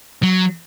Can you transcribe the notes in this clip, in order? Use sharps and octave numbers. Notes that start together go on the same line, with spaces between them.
F#3